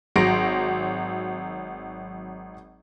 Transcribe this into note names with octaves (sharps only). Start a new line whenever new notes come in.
G#1 F#3 C6 A#6 D7